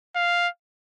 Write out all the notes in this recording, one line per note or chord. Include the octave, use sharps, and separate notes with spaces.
F5